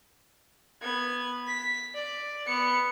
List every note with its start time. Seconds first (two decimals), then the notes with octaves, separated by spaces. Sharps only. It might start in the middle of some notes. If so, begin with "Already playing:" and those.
0.82 B3 G#6
1.47 B6
1.95 D5
2.46 B3 C#7